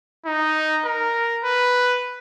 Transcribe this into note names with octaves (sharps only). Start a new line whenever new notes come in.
D#4
A#4
B4